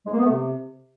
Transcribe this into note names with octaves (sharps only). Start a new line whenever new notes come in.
G#3
A#3
B3
A3
C3